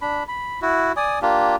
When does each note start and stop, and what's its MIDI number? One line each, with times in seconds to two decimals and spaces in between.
0.01 0.23 62
0.01 0.23 83
0.28 0.60 83
0.62 0.92 64
0.62 0.92 66
0.96 1.19 74
0.96 1.19 80
0.96 1.19 87
1.22 1.56 58
1.22 1.56 62
1.22 1.56 65
1.22 1.56 67